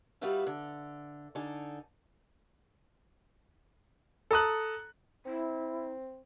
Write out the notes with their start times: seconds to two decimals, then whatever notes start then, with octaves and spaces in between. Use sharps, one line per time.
0.21 G3 D#4 F4 F#4 B4 E5
0.47 D3 A4
1.35 D3 D#4 A4 G#5
4.31 A4 A#5 D#6 F#6
5.26 C4 E4